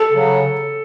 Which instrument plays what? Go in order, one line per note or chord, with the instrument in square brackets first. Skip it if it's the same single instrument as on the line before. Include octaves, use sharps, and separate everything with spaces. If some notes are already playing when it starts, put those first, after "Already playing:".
Already playing: [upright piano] A4
[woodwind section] C#3 F#3